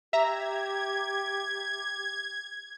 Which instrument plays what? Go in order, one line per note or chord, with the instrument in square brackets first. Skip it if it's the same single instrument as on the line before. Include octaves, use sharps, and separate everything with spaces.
[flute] G4 [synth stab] E5 A#5 [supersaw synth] G#6